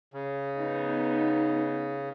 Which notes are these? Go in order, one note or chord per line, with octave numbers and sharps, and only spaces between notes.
C#3
B3 D#4